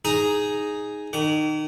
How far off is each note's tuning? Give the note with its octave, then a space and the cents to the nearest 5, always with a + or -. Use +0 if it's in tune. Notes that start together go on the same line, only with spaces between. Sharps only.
D#4 +0 G#4 +0 A#5 +0
D#3 -25 D6 -40